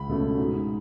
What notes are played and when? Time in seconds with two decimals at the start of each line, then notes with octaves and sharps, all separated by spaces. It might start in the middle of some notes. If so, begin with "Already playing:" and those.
Already playing: C#2 B5
0.09 B2 A3 C#4
0.38 G#2